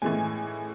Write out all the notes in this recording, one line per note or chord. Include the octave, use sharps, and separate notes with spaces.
A2 E3 G#3 G#5